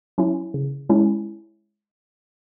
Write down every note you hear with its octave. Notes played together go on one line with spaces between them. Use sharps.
F#3 C#4 E4
C#3
G#3 C#4 E4